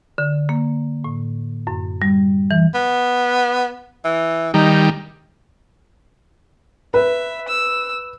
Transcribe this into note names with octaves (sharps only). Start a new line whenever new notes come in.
D3
A#3
A2
F#2
G3
E3
B3
E3
D#3 G3 D#4
B4 E5
E6